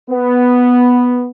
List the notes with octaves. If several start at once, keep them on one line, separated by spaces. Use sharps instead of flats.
B3